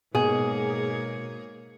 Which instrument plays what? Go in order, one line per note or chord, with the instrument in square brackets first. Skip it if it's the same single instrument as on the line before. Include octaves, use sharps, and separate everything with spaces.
[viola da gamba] G#2 A#3 C#5 [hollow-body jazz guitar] B2 [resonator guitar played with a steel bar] G#4